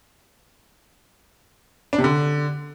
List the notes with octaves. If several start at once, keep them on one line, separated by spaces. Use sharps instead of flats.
D4
C3
D3